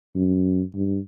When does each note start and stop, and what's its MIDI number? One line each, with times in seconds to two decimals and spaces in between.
0.15 0.62 42
0.75 0.99 43